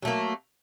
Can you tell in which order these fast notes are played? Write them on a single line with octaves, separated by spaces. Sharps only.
F#3 A3 A#3